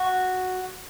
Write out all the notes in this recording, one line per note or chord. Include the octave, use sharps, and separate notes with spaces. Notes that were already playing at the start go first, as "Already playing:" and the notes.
Already playing: F#4